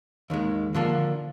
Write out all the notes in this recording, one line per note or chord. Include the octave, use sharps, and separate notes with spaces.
D#2 D#3 G#3
D3 F3 A#3 D4